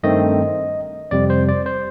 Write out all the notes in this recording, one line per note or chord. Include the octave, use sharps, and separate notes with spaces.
G2 D#3 A3 C4 D#5
F2 C3 G3 C4 D5
C5
D5
C5